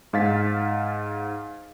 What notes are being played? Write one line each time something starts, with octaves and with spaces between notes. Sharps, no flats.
G#2 F5 A6 B6